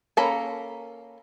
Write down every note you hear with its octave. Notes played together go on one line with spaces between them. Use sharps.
A#3 C#4 A4 A#5 B5